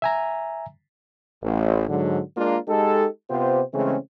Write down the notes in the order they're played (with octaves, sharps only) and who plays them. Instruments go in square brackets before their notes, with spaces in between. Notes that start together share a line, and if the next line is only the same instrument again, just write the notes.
[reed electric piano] E5 G#5 A#5
[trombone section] A1
G#2 D3 F#3
G#3 A#3 D4 F4 A#4
G#3 D#4 G4 A4
C3 B3 F4 G4 C5
C#3 E3 G#3 A3 C4 C#4